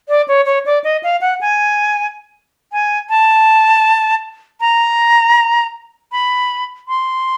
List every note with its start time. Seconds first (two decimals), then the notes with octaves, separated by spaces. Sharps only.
0.08 D5
0.28 C#5
0.45 C#5
0.65 D5
0.84 D#5
1.03 F5
1.21 F#5
1.41 G#5
2.72 G#5
3.09 A5
4.60 A#5
6.12 B5
6.88 C6